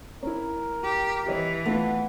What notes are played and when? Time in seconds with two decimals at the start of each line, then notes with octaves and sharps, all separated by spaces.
0.23 C#4 E4 A#4
0.84 G4
1.26 E3 G4 C#5 D#5
1.66 A3 B3 F4